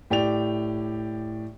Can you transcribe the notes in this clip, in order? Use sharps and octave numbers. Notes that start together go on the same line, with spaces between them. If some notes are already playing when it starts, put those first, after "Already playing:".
A2 G4 D5 G5 F7